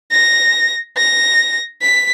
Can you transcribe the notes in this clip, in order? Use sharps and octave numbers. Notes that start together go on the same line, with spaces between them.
A#6
A#6
B6